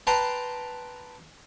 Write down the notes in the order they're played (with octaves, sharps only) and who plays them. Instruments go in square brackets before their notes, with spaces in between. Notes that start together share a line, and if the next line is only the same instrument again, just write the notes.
[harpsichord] B4 G5 A5 A#5 C6